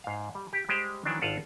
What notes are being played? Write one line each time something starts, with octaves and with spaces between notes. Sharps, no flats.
G#2 F5
G3
G4
G3 G#3 G4 G#4 C5
D#3 E3 F#3 D4
G#1 F4 F5 F#5 A5